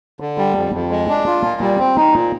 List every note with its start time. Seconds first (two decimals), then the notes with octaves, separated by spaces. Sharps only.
0.20 D3
0.38 G3
0.56 F2
0.73 F2
0.91 G#3
1.09 D4
1.26 F4
1.43 A#2
1.61 G3
1.78 C4
1.96 D#4
2.14 A#2